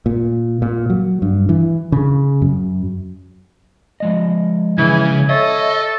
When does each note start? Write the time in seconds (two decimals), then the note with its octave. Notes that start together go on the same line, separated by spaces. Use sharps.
0.06 A#2
0.62 A#2
0.90 F#3
1.22 G2
1.49 E3
1.92 C#3
2.41 F#2
4.00 F3 G#3 D#5
4.78 C#3 E3 G#5
5.30 A4 C#5 D#5 E5